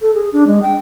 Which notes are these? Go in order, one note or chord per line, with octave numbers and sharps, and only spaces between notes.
A4
G#4
D4
G#3
G5